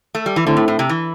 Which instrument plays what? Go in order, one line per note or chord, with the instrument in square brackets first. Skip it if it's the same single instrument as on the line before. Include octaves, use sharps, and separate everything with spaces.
[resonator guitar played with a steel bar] A3
G3
E3
[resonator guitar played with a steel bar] D3 [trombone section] A3 C4 E4
[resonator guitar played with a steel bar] A2
A2
C3
E3